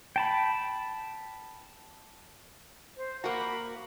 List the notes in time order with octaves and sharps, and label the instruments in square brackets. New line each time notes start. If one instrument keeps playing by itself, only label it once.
[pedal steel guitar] G5 A5 B5
[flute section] C5
[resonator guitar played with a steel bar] A#3 F#4 [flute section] A#5 B5 D6